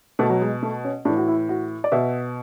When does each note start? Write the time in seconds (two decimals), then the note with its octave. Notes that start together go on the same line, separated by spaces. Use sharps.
0.19 B2 A3
0.30 F#3
0.42 G#3
0.63 A3
0.84 C#4
1.05 A2 E3 D4
1.17 F#4
1.28 E4
1.49 F#4
1.84 D5
1.92 B2 E5